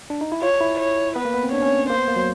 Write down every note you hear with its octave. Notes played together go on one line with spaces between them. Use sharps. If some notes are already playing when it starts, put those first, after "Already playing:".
D4
D#4
E4
F4 C#5
E4
C#5
B3 B4
A#3
B3
C4
D4 C#5
C#4
A#3 C5
B3
A#3
F#3